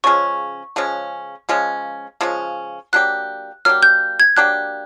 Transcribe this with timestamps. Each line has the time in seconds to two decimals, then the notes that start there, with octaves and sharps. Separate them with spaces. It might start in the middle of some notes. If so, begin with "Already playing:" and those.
0.04 C#3 F3 G#3 C#4 C#6
0.76 C#3 F3 G#3 C#4
1.49 C#3 F3 G#3 C#4
2.21 C#3 F3 G#3 C#4
2.93 F#3 A#3 D4 G4 F#6
3.65 F#3 A#3 D4 G4 F6
3.83 G6
4.20 G#6
4.37 F#3 A#3 D4 G4 F#6